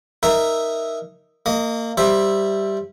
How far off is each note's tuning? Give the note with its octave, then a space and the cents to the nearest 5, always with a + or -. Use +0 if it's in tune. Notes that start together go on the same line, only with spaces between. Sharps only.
D#4 +0 A#4 +0 E5 +0
A#3 -25 D#5 +0
G3 +0 C5 +10 E5 +0